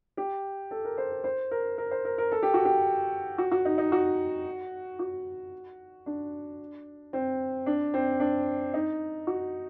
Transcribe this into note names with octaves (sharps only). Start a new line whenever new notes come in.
G4
A4
A#4
C5
A#4
C5
A#4
A#4
C5
A#4
A#4
A4
G4
F#4
G4
F#4
F#4
D#4
D#4
F#4
F#4
D4
C4
D4
C4
D4
D#4
F#4